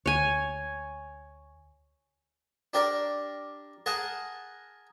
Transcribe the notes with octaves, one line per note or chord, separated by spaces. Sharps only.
D2 C#5 G#5
D4 G4 A#4 D5
G#4 A#4 F#5 A5 A#5